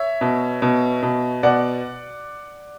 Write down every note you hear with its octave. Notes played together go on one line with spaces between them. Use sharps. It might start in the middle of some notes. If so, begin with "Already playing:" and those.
Already playing: C#5 E5
B2
B2
B2
B2 D5 F#5